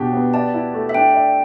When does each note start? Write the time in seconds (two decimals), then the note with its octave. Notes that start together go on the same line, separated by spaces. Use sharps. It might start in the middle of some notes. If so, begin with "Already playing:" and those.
Already playing: B2 D4 G4
0.13 B3
0.34 D5 A5
0.54 E4
0.74 A3
0.89 E5
0.94 D4 G5
1.14 D5